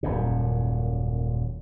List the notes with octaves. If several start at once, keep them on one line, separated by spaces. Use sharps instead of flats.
D#1 F#2 A#2